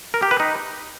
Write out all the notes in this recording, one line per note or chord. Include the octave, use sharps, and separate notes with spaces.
A#4
G4
B4
D#4